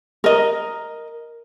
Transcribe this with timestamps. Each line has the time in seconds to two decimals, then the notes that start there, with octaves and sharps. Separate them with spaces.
0.24 A#4 D#5